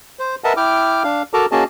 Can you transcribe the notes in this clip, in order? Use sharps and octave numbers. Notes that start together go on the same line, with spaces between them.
C5
A#4 B4 D#5 E5 F#5 A5
E4 G5 D6 F6
D4 F5
F#4 A4 A#4 A5 A#5 D6
A#3 C#4 F#4 G#4 D#5 A5